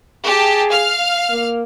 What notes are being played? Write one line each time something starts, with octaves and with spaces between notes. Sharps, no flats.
G4 G#4 A5
F5 F6
A#3